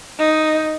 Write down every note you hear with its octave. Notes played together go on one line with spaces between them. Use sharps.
D#4